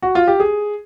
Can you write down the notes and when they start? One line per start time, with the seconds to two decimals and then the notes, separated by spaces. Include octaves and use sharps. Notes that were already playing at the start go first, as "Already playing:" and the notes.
0.02 F#4
0.15 F4
0.28 G4
0.40 G#4